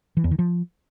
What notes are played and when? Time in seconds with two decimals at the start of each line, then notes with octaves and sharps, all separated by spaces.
0.17 E3
0.24 E2
0.31 D#3
0.39 F3